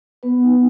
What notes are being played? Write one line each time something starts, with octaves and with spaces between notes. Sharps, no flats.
B3 B4
D#4